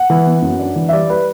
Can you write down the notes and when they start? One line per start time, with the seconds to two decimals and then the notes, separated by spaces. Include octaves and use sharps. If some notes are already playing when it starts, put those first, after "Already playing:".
Already playing: F#5
0.10 E3
0.26 B3
0.42 F#2
0.59 D4
0.76 E3
0.89 E5
0.93 G3 D5
1.10 B4